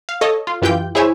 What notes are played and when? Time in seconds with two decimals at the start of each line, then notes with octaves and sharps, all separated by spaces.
0.09 F5
0.21 A4 C#5 D#5
0.47 F4
0.62 F#2 E3 F4 G4 G5 G6
0.95 E4 G#4 C5 C#5 E5 G#5